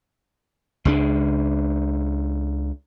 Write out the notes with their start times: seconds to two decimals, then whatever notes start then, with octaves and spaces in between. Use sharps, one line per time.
0.85 C#2 G#3 D4